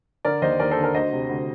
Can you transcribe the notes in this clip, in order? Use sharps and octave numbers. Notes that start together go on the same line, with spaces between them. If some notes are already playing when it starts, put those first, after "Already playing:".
D3 A#4 D5
D#2 C5 D#5
D#2 A#4 D5
A4 C5
D3
A#4 D5
D2 C5 D#5
C3
D2